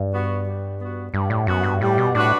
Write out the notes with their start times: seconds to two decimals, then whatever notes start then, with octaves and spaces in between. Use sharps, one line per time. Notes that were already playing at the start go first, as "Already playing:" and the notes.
Already playing: G2
0.12 B3 F#4
0.46 G3
0.79 B3 F#4
1.14 G2 G3
1.30 A2
1.47 F#2 B3 F#4
1.64 G2
1.81 A2 G3
1.98 B2
2.15 A2 D4 F#4 B4